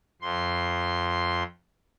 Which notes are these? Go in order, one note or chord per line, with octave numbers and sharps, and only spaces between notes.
F2 C6